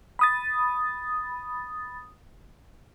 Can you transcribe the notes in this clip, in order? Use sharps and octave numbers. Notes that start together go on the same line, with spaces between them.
B5 D#6 A6